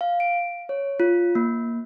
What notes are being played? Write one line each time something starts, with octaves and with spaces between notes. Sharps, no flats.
F5
D7
C#5
F4
A#3